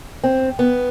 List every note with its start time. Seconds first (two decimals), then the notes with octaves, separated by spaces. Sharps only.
0.24 C4
0.59 B3